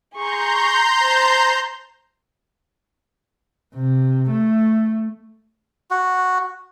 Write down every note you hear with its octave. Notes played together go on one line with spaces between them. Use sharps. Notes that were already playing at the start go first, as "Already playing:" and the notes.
G#4 A#5 C6 C#6 G6
C5 A5
C3
A3
F#4